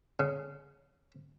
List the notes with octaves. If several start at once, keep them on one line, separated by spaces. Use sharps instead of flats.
C#3